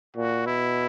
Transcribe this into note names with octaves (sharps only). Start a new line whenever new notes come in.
A#2 F#4
B2 E4